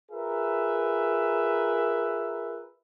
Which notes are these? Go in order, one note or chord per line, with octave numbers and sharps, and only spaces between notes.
F4 G#4 A#4 B4 E5